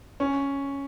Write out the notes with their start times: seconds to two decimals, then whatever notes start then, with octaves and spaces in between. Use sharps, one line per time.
0.20 C#4